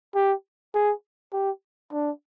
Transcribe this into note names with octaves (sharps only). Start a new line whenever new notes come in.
G4
G#4
G4
D4